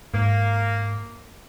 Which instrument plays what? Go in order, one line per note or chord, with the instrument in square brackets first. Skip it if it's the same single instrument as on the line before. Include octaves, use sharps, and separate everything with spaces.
[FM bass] G#2 [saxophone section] A#3